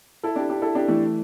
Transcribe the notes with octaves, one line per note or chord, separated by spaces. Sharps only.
E4 A4
D4 G4
D4 G4
E4 A4
D4 G4
E3 A3